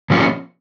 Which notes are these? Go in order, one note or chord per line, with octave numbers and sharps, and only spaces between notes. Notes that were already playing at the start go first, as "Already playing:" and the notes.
A#2 F3 A#3 C#4 F4